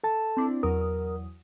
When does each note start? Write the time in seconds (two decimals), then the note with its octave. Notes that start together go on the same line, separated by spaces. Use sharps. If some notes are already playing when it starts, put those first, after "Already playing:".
0.04 A4 A5
0.37 C4 D4 E4
0.63 E2 F#3 A#4 D#6